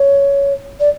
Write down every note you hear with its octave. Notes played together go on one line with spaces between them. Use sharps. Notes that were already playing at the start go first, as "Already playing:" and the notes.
Already playing: C#5
D5